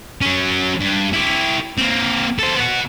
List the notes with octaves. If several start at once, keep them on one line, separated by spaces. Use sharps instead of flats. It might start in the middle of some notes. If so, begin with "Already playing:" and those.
F#3 C#4
G2
E4 G4
A#3 C4
A4 C5
B3 F#4